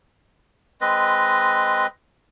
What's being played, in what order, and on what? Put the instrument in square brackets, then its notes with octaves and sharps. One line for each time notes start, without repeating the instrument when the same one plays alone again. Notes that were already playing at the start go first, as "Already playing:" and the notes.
[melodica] G#3 C4 B4 D#5